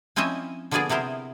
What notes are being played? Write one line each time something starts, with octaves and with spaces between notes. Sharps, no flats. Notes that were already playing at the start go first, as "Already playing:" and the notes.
F3 C4 C#4 E4 D#5 E5
D3 F3 A#3 B3 G#4 D5
C3 B3 E4 A#4 C5